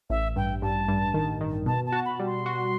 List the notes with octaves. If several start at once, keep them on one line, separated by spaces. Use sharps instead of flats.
A1 E5
G2 G5
G2 A5
G2
D#3
D#3
B2 A5
A5
F#4
B5
G3
C6
F#4